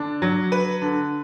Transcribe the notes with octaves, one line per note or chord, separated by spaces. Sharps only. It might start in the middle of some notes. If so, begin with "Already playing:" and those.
Already playing: D3 D4
F#3
B4
D3